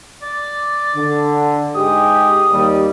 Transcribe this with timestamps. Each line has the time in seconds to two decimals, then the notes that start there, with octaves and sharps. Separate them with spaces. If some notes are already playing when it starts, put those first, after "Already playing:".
0.22 D5
0.95 D3
1.75 G#2 G#3 G4 D#6
2.51 D#2 G3